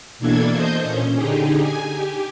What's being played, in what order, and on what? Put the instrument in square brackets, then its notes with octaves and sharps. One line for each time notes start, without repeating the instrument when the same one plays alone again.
[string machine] B2 E3 A#3 D4 A4 G#6
C5 D#5 G6
A#2 C#4
D3 D#4 G4 G#4
G#5
G4